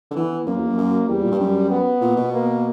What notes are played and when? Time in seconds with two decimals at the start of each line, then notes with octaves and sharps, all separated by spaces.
0.11 D3
0.16 E3 B3
0.46 F#2 A#3
0.57 E2
0.67 F#2
0.77 F#2
1.08 E2 G3
1.24 A#2
1.32 G2
1.39 F#2
1.70 B3
2.01 A#2
2.16 B2
2.33 A#3